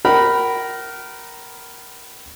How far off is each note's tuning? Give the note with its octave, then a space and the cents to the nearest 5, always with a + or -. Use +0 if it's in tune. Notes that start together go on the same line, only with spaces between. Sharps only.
A#4 +0 G5 -45 B5 +0